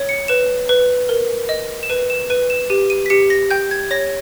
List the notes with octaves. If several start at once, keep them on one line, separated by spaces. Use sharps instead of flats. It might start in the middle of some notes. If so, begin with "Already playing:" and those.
Already playing: C#5
C#7
B4 E7
B4
A#4
D#5
E7
B4 D#7
E7
B4 D#7
E7
G4 D#7
D#7
B6
G4 C#7
A#6
G5 G6
G#6
C#5 A#6